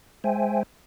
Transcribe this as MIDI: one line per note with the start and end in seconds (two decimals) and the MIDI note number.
0.24 0.63 56
0.24 0.63 72
0.24 0.63 76
0.24 0.63 79
0.24 0.63 80